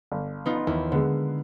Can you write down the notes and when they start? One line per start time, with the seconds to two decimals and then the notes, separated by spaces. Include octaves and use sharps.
0.12 G1
0.46 B3 D#4 F4
0.67 D#2 E3
0.92 D3 G#3 B3